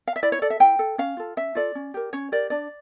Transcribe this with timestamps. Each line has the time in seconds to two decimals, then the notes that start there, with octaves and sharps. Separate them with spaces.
0.07 F5
0.16 E5
0.23 E4 D5
0.32 C#5
0.42 A4 D5
0.50 E5
0.60 E4 G5
0.79 A4
0.98 C#4 F5
1.17 F4 A4
1.37 C#4 E5
1.55 F4 A4 D5
1.75 C#4
1.94 G4 A#4
2.13 C#4 C#5
2.32 G4 A#4 D5
2.50 D4 D5